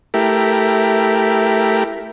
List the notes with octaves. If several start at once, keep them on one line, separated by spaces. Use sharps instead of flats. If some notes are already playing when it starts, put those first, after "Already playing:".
A3 E4 G4 A#4